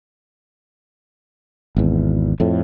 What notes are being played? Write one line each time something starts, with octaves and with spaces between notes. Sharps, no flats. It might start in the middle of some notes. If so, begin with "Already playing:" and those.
G#1 E2
F2 A2